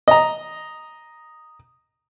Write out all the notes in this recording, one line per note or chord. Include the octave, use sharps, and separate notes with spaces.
D#5 A#5